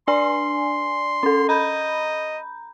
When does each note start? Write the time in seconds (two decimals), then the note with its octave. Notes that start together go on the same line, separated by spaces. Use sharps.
0.08 D4 D5 G#5 C6
1.23 C#4 A4
1.49 D#5 A#5 B5 G6